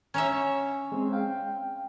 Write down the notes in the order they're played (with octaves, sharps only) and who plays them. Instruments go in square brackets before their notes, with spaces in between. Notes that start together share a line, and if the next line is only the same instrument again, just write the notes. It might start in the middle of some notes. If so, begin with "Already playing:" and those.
[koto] C#4 C#5 E5 [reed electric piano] A#5
[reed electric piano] G#3 C4
F5 G5